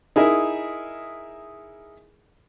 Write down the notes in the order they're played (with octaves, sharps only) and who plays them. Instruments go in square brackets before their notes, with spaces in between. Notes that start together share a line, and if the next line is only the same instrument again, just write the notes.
[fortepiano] D#4 E4 G#4 A#4 E5